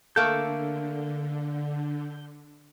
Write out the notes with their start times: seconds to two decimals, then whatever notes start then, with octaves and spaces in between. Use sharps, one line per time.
0.16 D3 A3 A#3 A4 G6